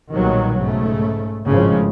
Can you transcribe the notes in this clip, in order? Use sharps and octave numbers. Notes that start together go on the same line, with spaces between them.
B1 A#2 D#3 F#3 G3
G#2 C#3 A3
G#1 A2 C#3 F3 G#3